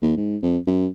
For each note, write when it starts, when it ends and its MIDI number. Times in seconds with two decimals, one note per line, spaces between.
0.02 0.12 39
0.17 0.37 44
0.42 0.58 41
0.67 0.87 42